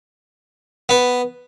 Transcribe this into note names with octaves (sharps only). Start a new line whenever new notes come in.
B3